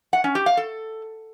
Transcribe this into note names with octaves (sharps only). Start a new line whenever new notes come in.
F#5
C#4
G4
F5
A4